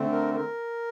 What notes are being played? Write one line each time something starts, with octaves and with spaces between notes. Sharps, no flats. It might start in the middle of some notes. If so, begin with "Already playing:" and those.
Already playing: D3 A3 C4
A#4
A#4